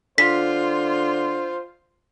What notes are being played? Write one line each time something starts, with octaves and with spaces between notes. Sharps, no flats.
D3 F4 C5 B6